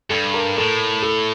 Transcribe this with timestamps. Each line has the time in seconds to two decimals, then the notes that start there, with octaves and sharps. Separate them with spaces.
0.10 G2 A4
0.34 A#4
0.57 A2 A4
1.03 A4